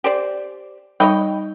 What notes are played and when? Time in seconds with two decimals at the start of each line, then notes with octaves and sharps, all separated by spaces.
0.04 G4 C5 D5
1.00 G3 D#4 C#5 D#5 G5 B5